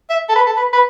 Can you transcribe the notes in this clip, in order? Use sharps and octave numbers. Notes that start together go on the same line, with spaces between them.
E5
A4
B4
A4
B4
B4